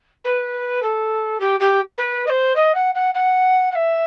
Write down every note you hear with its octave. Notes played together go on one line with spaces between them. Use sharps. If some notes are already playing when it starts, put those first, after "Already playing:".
B4
A4
G4
G4
B4
D#5
C5
D#5
F#5
F#5
F#5
F#5
E5